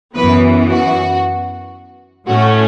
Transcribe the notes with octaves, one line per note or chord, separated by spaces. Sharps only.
F#2 E3 B3 B4
F#4
A2 A3 C#4 F#4